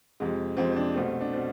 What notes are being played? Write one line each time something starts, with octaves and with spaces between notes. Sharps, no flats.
F2 C3 G#3
F2 C3 G#3 C4
C4
D4
C2 B2 A3 C4
D4
B2 C4